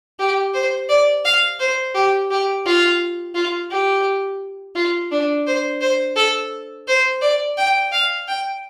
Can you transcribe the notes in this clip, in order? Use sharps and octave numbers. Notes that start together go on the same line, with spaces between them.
G4
C5
D5
F5
C5
G4
G4
F4
F4
G4
F4
D4
C5
C5
A4
C5
D5
G5
F5
G5